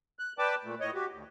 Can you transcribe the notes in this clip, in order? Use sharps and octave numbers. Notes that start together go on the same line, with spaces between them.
F#6
B4 D5 G5 A5 D6
A#2 A3
A2 C#5 D#5
F#4 G4
D2